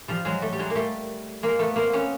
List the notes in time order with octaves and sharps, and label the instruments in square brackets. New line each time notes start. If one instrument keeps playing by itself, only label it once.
[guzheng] F3 G3
F#3 G#3
G3 A3
G3
F#3 G#3
A#3
G3 A3
G#3 A#3
A3 B3
A#3 C4
B3 C#4